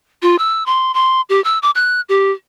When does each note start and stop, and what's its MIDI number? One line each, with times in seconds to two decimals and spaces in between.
0.22 0.36 65
0.39 0.66 88
0.66 0.92 84
0.94 1.21 84
1.29 1.43 67
1.44 1.58 88
1.62 1.70 86
1.75 2.01 90
2.09 2.32 67